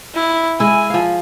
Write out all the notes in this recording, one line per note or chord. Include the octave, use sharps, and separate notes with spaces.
E4
G#3 E4 G#5
F3 F5